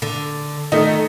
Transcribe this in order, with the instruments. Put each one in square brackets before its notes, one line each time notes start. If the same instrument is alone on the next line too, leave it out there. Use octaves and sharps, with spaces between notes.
[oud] D3
[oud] D#3 [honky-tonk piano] A3 D#4